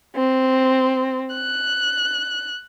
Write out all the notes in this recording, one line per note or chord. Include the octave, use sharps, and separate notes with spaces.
C4
F#6